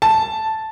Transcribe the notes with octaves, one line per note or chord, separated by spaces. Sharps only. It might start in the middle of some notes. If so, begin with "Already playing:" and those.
A5